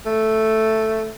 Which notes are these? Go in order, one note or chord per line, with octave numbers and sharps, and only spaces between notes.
A3